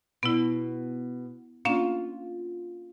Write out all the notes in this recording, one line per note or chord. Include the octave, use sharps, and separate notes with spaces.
B2 B3 E4
A#3 C#4 D4 F4